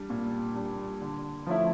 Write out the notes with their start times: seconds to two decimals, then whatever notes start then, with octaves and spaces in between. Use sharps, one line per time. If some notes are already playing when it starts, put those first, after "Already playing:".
Already playing: G3 D4
0.10 A#2
0.56 G3 D4
1.01 D3
1.47 F3 A3 C#4 E4